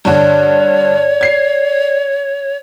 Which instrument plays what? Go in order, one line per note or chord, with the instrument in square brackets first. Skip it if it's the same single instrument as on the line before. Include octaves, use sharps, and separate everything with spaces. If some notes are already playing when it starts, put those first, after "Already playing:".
[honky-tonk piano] G2 D3 [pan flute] C#5 [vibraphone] D5
[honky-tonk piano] G#6 C7